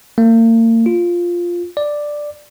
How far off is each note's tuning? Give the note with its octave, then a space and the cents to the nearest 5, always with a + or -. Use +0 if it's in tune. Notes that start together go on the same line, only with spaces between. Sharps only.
A#3 -40
F4 +0
D5 +5